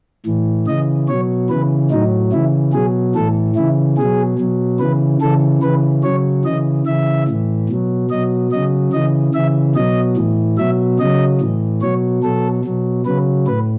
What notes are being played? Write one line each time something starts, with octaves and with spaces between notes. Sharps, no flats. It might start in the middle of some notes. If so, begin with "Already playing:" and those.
A2 E3
C#3 E3 D#5
B2 F#3 C#5
C#3 E3 B4
A2 F#3 D#4
C#3 E3 E4
B2 F#3 G#4
A2 E3 A4
C#3 E3 E4
B2 F#3 G#4
B2 F#3
C#3 E3 B4
C#3 E3 A4
C#3 E3 B4
C#3 F#3 C#5
C#3 E3 D#5
C#3 E3 E5
A2 E3
B2 F#3
B2 F#3 D#5
C#3 F#3 D#5
C#3 E3 D#5
C#3 E3 E5
B2 F#3 D#5
A2 E3
B2 F#3 E5
C#3 F#3 D#5
A2 E3
B2 F#3 C#5
B2 F#3 A4
B2 F#3
C#3 F#3 B4
A2 B4